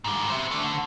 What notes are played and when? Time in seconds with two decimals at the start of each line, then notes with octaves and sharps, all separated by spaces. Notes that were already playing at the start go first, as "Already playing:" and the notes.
0.04 G#2 G3
0.30 C5 E5
0.51 A3 D4
0.63 D3